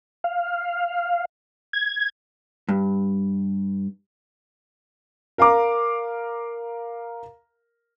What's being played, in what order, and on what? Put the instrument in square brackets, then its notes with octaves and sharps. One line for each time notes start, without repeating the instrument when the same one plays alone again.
[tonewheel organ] F5
G#6
[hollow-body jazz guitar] G2
[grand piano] A#4 F5 A#5 D6